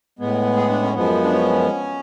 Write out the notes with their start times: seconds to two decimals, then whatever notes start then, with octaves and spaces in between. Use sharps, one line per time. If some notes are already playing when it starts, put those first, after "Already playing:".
0.19 A2 G#3 B3
0.56 G#4
0.70 D4
0.82 C#4
0.94 F#2 F3 G#3 B3
1.23 D4
1.33 C#4